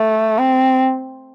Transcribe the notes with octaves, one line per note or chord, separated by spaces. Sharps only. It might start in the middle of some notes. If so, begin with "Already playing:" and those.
Already playing: A3
C4